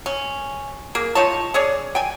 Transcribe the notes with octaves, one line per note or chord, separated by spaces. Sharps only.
C#4
A#3 G#4
D#4 F4 C#5 A5
C#4 G#4 C#5 D5
G5 G#5